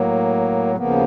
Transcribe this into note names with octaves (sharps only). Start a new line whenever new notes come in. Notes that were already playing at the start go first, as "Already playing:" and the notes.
Already playing: A2 F#3 A#3
D#2 C#3 F3 A#3 B3